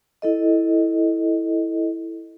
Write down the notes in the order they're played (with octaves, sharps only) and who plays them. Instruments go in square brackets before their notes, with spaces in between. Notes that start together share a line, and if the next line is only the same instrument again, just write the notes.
[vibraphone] E4 A4 D#5